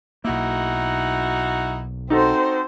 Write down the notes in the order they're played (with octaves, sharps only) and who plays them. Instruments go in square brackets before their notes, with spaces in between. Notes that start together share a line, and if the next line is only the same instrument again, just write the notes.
[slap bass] B1 A#3 [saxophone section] D#4 E4 F#4
[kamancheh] C4 C5 [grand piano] D#4 F#4 A4